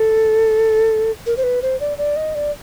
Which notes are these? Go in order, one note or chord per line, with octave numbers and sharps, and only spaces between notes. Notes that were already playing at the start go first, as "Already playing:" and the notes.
Already playing: A4
A#4
C5
B4
C5
D5
D5
D#5
D5